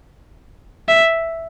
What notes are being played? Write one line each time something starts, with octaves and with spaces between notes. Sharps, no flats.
E5